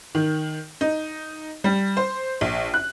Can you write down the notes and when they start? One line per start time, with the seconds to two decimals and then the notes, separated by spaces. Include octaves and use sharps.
0.15 D#3
0.81 D#4
1.64 G3
1.97 C5
2.41 A#1
2.74 F#6